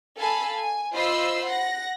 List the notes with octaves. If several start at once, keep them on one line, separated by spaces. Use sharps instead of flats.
A4 F5 G#5 A5 B5
G#5
F4 C5 D#5 B5 C6 E6
F#5 A#6